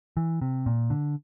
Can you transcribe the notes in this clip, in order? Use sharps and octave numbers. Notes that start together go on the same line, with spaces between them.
E3
C3
A#2
D3